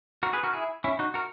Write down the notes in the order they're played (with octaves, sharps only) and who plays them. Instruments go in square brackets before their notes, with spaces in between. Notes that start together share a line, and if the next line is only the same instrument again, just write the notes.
[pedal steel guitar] F#4 A#4
G#4 B4
F#4 A#4
E4 G#4
C#4 E4
D#4 F#4
F#4 A#4